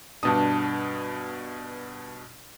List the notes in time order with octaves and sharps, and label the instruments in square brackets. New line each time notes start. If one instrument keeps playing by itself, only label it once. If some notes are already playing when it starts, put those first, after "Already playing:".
[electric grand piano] G2 B2 D#6 [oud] D4